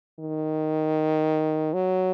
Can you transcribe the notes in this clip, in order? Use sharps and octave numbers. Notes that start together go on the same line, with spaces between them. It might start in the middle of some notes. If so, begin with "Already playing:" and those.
D#3
F#3